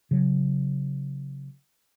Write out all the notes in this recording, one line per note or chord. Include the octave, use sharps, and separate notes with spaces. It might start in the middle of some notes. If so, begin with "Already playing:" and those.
C#3 F#3